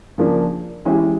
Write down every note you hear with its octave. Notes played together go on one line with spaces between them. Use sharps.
C#3 F3 A#3 D4
E3 G#3 C#4 E4 G4